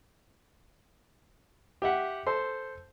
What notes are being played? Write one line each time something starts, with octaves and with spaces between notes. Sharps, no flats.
G4 E5 F#5
A4 C5 C6